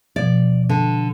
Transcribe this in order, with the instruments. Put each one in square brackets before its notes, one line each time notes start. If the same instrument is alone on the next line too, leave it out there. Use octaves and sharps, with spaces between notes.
[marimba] B2 F3 [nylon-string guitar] D5
[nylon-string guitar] D3